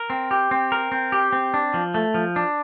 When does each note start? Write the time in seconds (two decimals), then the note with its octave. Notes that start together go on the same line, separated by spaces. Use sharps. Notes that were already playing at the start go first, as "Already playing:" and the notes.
Already playing: A#4
0.10 C4
0.31 G4
0.51 C4
0.72 A#4
0.92 C4
1.12 G4
1.33 C4
1.54 D4
1.74 F3
1.94 A3
2.14 F3
2.36 D4